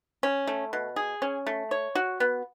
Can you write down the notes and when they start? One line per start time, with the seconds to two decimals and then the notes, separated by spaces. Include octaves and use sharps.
0.23 C#4
0.47 A3
0.73 B2
0.96 G#4
1.22 C#4
1.47 A3
1.71 C#5
1.95 F#4
2.20 B3